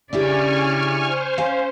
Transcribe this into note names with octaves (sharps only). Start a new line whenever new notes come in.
C#3 D4 E4 G4 D5 G#5 C#6 F6
C5
C#4 F5 G#5